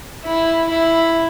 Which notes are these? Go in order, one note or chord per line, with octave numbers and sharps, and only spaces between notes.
E4
E4